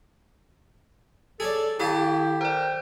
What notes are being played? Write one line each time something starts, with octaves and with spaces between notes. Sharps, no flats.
G#4 A4 C#5 D5 A5
D#3 E4 G4 A4 F5 G#5 A5
A#4 C5 D5 G5